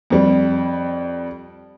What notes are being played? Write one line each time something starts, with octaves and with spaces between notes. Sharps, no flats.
F2 G3